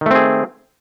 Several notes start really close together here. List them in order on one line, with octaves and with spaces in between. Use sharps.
D#3 A3 C4 G#4